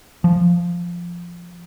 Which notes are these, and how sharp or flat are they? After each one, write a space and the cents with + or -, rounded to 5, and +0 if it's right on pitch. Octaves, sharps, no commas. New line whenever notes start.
F3 -5